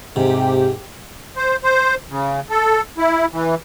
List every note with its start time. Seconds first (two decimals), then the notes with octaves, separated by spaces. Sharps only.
0.16 G#2 C3 G4
1.36 C5
1.64 C5
2.10 C#3
2.50 A4
2.98 E4
3.32 E3